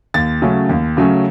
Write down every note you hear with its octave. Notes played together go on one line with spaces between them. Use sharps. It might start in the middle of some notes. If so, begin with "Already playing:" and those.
D#2 A6
C#3 F#3 A3 C#4
D#2
C#3 F#3 A3 C#4